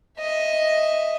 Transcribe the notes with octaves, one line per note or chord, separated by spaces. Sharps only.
D#5 E5